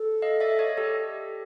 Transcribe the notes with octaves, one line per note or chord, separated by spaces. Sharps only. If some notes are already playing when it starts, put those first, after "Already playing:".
Already playing: A4
D#5 F5
D5 E5
C#5 D#5
G4 A4